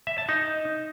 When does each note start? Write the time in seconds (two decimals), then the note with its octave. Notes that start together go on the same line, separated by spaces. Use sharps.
0.07 E5
0.18 A5
0.29 D#4